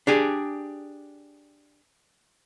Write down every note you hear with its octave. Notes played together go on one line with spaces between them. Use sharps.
D4 G4 G#4